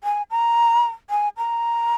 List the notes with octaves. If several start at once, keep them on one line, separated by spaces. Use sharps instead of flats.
G#5
A#5
G#5
A#5